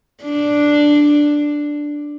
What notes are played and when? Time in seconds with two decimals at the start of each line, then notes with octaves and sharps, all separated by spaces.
0.24 D4